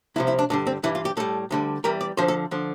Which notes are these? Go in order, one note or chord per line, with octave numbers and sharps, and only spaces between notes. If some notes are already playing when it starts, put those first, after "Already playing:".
C2 C3 F3 E4
E4
D4
G2 D3 G3 D4
C4
G2 E3 G3 E4
F4
G4
A2 G3 A4
D2 D3 G3
E2 E3 G3 A#4
D5
F2 D3 F3 C5
A4
D3 F3